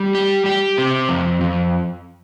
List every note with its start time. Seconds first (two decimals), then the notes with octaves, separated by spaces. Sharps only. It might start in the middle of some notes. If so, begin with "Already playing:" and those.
Already playing: G3
0.15 G4
0.46 G4
0.78 C3
1.09 F2
1.41 F2